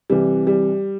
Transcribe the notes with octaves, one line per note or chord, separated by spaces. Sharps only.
C2 C3 E3 G3
G3